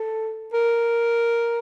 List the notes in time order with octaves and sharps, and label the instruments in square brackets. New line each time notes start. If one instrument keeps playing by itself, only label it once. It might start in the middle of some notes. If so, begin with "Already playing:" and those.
Already playing: [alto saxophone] A4
A#4